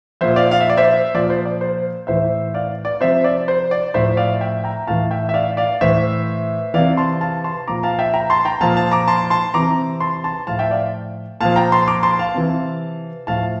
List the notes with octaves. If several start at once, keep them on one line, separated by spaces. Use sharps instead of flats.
A#2 F3 C5 E5
D5 F5
F5
E5
D5
C5 E5
A#2 F3 D5
C5
D5
C5
A2 E3 C5 E5
D5 F5
D5
C3 F3 C5 E5
D5
C5
D5
A2 F3 C5 E5
D5 F5
E5 G5
G5 A#5
A2 E3 F5 A5
E5 G5
E5
D5 F5
D5 F5
A2 E3 C5 E5
C3 E3 D5 F5
A5 C6
F5 A5
A5 C6
A#2 F3 A#5 D6
F5 A5
E5 G5
G5 A#5
A5 C6
G5 A#5
A#2 F3 F5 A5
F5 A5
A#5 D6
A5 C6
A5 C6
C3 E3 A#5 D6
A5 C6
A5 C6
A2 F3 F5 A5
E5 G5
D5 F5
A#2 F3 F5 A5
G5 A#5
A5 C6
A#5 D6
A5 C6
F5 A5
C3 E3
A2 F3 F5 A5